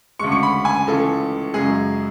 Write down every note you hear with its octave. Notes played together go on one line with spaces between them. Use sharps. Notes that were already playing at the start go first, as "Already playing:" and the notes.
D2 C#3 G#3 C#6
C#6
B5
G#5
C#2 C#3 E3 A3 A4
F#2 C#3 G#3 G#4